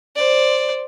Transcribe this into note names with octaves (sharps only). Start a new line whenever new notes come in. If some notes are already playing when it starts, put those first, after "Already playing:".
C5 D5